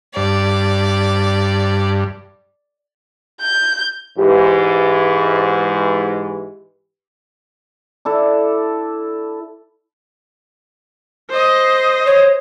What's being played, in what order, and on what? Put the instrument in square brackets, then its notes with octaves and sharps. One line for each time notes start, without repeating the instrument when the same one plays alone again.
[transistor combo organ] G2 [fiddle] D5
[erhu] G6
[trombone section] G#2 E3 [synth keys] G4 B4
[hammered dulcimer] D4 E4 A4
[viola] C5 D#5
[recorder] C#5